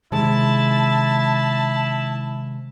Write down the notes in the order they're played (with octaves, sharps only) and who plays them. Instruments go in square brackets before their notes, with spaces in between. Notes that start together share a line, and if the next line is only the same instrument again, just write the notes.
[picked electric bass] C3 D#3 G#3 [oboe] E4 [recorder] A5